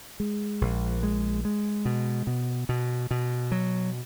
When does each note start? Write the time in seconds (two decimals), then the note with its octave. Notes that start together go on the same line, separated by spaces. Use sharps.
0.20 G#3
0.61 A#1
1.03 G#3
1.45 G#3
1.85 B2
2.27 B2
2.69 B2
3.11 B2
3.52 F#3